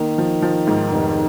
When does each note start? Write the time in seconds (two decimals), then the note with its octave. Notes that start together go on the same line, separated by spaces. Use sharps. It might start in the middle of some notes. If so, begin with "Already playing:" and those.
Already playing: D#3 A#3
0.18 F3
0.42 F3
0.67 G#2
0.92 F1